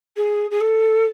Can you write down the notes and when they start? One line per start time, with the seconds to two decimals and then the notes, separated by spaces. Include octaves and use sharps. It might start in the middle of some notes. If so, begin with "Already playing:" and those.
0.16 G#4
0.50 G#4
0.60 A4